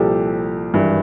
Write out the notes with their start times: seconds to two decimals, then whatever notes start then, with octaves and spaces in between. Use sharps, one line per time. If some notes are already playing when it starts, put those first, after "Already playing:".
Already playing: C2 A#2 F3 G4 A4
0.73 G#1 G2 E3